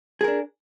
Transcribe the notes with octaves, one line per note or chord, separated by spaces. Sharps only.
D4 G#4 A#4